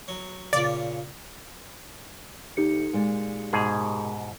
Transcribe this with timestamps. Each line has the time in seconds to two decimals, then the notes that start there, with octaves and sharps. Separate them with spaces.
0.08 F#3
0.53 A#2 C#3 D5
2.57 D2 D#4 G4 C#7
2.93 A#2 G#3 D5
3.53 G#2 B2 G#4